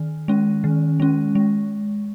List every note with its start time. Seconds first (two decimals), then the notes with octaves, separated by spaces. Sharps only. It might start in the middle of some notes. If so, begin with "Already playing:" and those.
Already playing: D#3
0.28 G#3 C#4
0.64 D#3
1.00 G#3 C#4
1.35 G#3